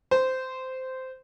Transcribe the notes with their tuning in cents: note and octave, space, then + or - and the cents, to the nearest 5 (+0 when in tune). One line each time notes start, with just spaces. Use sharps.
C5 -15